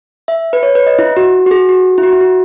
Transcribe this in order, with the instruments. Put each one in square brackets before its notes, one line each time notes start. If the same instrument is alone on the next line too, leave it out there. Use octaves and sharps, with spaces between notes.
[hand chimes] E5
B4
C#5
B4
D#5
E4
F#4
F#4
G#4
F#4
E4
F#4
E4
F#4